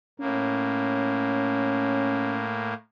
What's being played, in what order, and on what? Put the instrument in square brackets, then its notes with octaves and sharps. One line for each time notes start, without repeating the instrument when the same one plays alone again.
[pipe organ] A2 A#3 [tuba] C#4